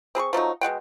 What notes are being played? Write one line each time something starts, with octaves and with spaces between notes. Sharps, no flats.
C4 G#4 B5 C#6
F3 F#3 A3 D#4
B2 G#3 F#5 G5